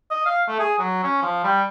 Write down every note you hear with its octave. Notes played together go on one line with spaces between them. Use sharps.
D#5
F5
A3
G#4
F#3
C#4
F3
G3